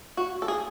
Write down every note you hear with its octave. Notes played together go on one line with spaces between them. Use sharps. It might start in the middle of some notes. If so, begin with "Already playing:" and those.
F#4
A4
G#4